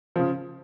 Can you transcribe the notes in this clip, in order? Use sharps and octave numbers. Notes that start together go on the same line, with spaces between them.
C#3 F3